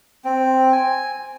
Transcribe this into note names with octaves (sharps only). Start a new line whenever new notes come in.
C4
G#5